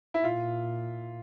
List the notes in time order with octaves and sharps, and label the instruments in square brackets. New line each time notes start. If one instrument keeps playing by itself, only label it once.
[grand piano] E4
[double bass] A#2 [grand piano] F4